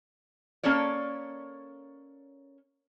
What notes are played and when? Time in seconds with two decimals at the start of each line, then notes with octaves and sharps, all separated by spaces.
0.63 A#3 C#4 A4 C#5 D5